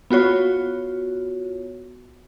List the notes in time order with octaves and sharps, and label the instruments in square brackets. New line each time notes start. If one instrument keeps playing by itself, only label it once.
[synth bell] B3 F4 F#4 C#5